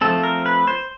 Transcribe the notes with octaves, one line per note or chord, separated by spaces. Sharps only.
F3 A3 C4 A4
A#4
B4
C5